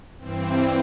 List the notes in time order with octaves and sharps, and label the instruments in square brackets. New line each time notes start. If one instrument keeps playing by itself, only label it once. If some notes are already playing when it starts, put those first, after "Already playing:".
[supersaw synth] G2 E3 C4